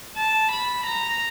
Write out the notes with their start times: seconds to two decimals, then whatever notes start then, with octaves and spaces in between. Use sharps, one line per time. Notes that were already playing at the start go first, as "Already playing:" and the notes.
0.17 A5
0.52 B5
0.86 A#5